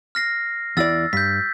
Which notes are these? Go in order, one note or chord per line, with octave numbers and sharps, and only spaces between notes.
F6 A#6 C7
E2 E4 D5 E6 A6
G2 G6 B6